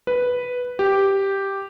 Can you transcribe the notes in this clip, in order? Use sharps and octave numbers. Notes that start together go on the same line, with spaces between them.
B4
G4